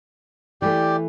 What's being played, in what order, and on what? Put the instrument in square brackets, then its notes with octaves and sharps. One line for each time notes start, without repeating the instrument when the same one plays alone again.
[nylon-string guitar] E3 A3 [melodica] G4 D5